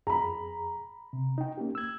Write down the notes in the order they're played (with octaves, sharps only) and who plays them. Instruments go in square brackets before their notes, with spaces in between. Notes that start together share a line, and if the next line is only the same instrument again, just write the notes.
[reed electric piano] F2 G#4 [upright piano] A#5 B5
[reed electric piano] C3
D#4 G5
A#3 C#4 G4
E6 G#6